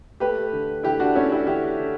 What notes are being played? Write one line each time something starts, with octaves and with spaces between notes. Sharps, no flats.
A3 G4 B4
D3
D3 E4 G4
D4 F#4
A3 C#4 E4
E4 G4
D3 E4 G4
D3